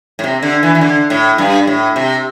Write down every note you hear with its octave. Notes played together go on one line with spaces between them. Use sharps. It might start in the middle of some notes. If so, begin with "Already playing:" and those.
A2
C3
D3
E3
E3
D3
A2
G2
A2
C3